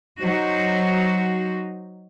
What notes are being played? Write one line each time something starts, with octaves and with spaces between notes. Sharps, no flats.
F#3 D#4 F#4 C5